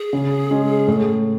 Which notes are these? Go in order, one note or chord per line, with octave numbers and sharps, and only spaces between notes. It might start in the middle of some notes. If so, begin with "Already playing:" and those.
Already playing: G#4
C#3
G#3 C#4
A2